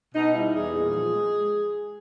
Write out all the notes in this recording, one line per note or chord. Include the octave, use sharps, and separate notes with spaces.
B2 D#4
G3 E4
E2 G#4
A#2
F3
G#3